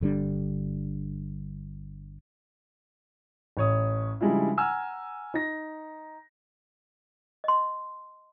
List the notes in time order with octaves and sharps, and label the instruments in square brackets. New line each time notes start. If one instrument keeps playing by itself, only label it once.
[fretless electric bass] G1 D3 G3 D4
[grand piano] A1 C#5 D#6
C#3 F3 G3 G#3 D4 E4
F#5 G#5 A#5 E6 F6
D#4 A#6
[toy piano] D#5 C6